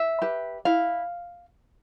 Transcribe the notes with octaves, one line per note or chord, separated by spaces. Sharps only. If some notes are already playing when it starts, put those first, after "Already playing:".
Already playing: E5
G4 B4
E4 F5